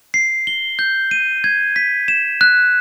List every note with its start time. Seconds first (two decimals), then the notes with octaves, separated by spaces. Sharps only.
0.14 C7
0.47 G7
0.79 G6
1.11 D#7
1.44 G#6
1.76 B6
2.08 E7
2.41 F#6